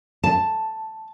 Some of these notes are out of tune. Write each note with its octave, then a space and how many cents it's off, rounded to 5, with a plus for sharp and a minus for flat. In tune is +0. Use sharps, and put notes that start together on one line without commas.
A5 +0